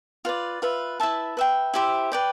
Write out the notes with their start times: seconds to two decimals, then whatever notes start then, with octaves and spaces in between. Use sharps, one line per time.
0.25 F4 B4 D5
0.62 F4 B4 E5
1.00 E4 B4 E5 A5
1.37 B4 E5 G5
1.74 E4 G4 C5 E5
2.12 B4 D5 G5